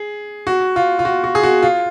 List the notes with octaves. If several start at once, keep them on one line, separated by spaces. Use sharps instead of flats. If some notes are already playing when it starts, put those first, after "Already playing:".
Already playing: G#4
F#4
F4
F4
F#4
F#4
G#4
F#4
F4